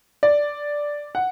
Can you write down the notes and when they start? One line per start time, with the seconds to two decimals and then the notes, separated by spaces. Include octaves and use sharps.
0.23 D5
1.15 F#5